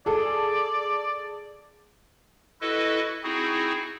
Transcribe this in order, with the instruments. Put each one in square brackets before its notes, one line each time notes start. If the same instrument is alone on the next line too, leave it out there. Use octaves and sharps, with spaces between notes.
[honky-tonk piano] G#4 A4 [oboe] D5
[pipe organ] E4 F#4 A4 B4 D#5
C4 D#4 E4 F#4 G#4